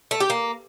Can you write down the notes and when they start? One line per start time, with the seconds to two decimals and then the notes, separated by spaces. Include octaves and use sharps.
0.11 A3
0.20 G4
0.30 A#3